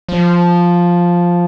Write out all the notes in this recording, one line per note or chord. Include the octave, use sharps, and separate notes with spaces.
F3